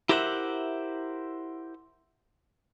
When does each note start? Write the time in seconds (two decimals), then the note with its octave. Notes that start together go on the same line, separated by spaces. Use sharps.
0.09 E4 G4 A#4 C5 E5 F#5